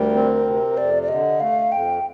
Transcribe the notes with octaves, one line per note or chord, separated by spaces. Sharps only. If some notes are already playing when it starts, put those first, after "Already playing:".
Already playing: D2 G3 A#4
C4
C3
F2 D5
D5
D3 D#5
A3 F5
F2 G5